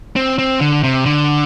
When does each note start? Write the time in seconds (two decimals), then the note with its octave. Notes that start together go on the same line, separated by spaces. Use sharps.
0.16 C4
0.39 C4
0.61 D3
0.83 C3
1.06 D3